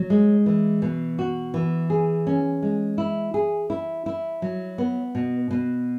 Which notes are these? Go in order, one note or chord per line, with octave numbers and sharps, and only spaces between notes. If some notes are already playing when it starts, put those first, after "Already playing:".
Already playing: F#3
G#3
E3
B2
F#4
E3
G#4
C#4
G#3
E4
G#4
E4
E4
F#3
B3
B2
B2